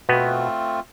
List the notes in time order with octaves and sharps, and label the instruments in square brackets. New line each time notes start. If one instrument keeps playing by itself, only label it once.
[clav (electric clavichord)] B2 B3 [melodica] A3 C4 F4